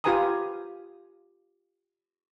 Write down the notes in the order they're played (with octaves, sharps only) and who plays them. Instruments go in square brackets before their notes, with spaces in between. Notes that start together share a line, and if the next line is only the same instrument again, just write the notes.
[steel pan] F4 G4 B4 G#5 A#5 D#6